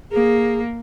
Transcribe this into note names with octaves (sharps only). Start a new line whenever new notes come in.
A#3 G#4